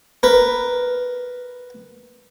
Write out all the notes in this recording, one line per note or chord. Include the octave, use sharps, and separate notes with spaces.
A#4 B4